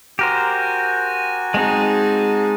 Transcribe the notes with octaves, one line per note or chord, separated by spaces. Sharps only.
F#4 G4 A#4 C5 G#5
G#3 C4 D#4 G#4 A5